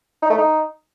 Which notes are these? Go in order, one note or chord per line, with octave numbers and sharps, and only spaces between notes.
D#4
A3
D#4